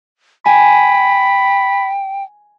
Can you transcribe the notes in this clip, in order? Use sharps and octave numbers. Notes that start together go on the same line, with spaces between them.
G5 G#5 B5